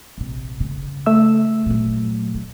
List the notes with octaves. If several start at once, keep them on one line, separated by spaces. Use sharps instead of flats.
A#1 C3
C#3
A3 E5 E6
A#2 F#3
A#2